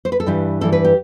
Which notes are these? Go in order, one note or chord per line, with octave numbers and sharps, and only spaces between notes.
C5
B4
A4
G2 E3 G3 G4
G2 E3 G3 A4
B4
G4